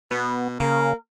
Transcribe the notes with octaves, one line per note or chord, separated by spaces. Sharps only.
B2 B3
C#3 A#3 A#4